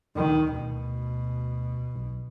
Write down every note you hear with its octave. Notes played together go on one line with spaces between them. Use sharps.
D2 D#3
D2 B2
B1